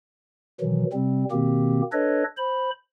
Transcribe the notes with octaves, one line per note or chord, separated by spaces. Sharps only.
B2 D#3 E3 F#3
C3 G3 C4
B2 D#3 A#3 C4 G4
D4 A4 B4 C#5 D#5
C5 B5